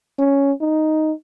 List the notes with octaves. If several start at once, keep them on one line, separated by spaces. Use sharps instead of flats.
C#4
D#4